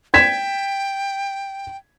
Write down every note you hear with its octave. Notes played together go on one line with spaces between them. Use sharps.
G5 G#6 B6 E7